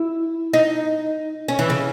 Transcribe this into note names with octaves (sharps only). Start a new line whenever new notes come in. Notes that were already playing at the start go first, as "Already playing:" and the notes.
Already playing: E4
D#4
C#4
E3
C#3